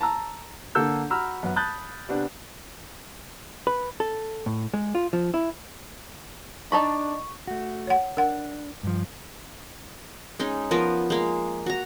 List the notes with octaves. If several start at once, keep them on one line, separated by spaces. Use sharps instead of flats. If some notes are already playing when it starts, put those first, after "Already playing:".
A5 A#5 E6
D3 A#3 A4 E6 G6
F#4 A#5 B5 E6 F6
F#2 B3
A5 B5 D#6 F#6 G6 A6
C3 B3 D4
B4
A4
A2
G#3
F4
F3
E4
D4 D#4 A5 B5 C#6
A3 F#4
C#5 F#5
D4 A#4 F#5
G2 F3
G#3 C#4 D#4
F3 B3 A#4 B4
G#3 A#3 F5
F#4 A#5